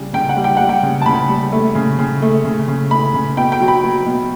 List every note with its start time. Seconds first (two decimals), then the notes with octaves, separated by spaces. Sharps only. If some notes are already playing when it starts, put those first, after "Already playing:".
Already playing: C#3 G3
0.13 C#3 G5
0.29 F#5
0.37 G3
0.44 G5
0.57 G3 F#5
0.69 G5
0.83 C#3
1.02 A5
1.06 C#3 B5
1.29 G3
1.52 A3
1.75 C#3
1.99 C#3
2.22 A3
2.45 C#3
2.68 C#3
2.91 A3 B5
3.14 C#3
3.37 B2 G5
3.52 G5
3.60 F#3
3.68 B5
3.84 F#3
4.06 B2